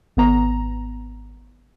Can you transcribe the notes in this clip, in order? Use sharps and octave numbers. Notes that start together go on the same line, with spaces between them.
G#1 B3 A#5